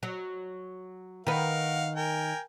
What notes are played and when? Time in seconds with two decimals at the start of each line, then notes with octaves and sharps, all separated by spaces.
0.03 F#3
1.27 D#3 A#4 B4 F5 F#5
1.96 A#4 G5 G#5